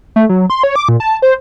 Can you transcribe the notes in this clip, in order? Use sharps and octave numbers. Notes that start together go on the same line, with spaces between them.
A3
F#3
C6
C#5
D6
A#2
A5
C5